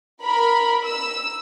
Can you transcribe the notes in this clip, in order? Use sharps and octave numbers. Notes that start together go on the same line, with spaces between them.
A#4 B5
E6